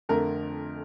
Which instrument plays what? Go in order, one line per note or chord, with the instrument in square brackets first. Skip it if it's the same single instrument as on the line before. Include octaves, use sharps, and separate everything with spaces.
[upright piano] F2 D3 A3 A#4